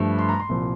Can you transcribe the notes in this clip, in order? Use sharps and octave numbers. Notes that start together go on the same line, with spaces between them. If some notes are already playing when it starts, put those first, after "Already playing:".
Already playing: G2 F3 A3
C6
A#5
C6
C2 A#2 F3